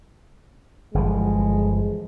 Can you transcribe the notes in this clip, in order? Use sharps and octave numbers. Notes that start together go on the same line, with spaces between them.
G1 E3 F3 G#3